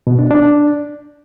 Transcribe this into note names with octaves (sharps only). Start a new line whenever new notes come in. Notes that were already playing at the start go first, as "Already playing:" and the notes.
B2
D4
D4